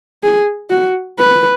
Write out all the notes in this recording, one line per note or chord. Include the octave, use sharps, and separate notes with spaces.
G#4
F#4
B4